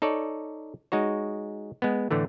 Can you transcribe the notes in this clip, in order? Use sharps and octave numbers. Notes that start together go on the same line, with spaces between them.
D#4 A4 C#5 D5
G#3 D#4 F#4 C#5
G#3 B3
A2 D3 E3 A3